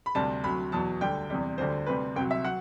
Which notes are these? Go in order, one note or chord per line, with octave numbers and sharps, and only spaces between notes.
B5
D2 C3 G3 A5
D2 C3 F#3 B5
E2 B2 F#3 A5
D2 D3 G3 G5
E2 C3 G3
D2 D3 G3 C5
D2 C3 G3 B4
C2 C3 F#3 G5
E5
F#3 F#5